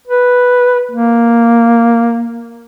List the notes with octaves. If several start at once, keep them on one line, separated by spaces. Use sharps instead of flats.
B4
A#3